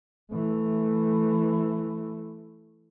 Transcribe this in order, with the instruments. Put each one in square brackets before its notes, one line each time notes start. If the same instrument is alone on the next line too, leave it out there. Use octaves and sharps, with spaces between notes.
[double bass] E3 A3